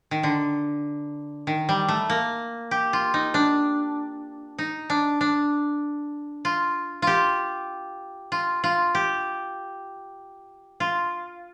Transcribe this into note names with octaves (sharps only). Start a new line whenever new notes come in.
D#3
D3
D#3
G3
A3
A#3
G4
F4
D#4
D4
D#4
D4
D4
F4
F4 G4
F4
F4
G4
F4